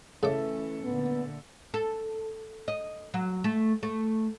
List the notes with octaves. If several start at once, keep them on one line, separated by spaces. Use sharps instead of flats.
C#3 E3 A3 C#4 A4 E5 D6
A#2 D3 B3
A4
D#5
F#3
A3
A3